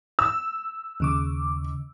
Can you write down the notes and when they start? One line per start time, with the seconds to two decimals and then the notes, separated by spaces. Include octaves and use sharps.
0.19 E6
1.00 D#2 C#3 D6